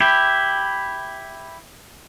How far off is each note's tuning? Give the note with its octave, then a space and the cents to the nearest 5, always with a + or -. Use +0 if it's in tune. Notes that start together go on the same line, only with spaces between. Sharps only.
E4 +0 G4 +0